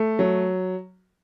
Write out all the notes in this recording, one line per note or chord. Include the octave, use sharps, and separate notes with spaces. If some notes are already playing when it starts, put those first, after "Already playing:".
Already playing: A3
F#3